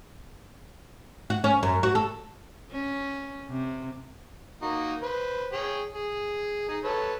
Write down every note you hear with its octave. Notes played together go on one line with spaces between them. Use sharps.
F#4
C#4
F#2
F#4
A4
C#4
C3
A#3 D#4 F#4
B4 C5
G#4 C#5 G5
G#4
D#4 G#4
A4 B4 C#5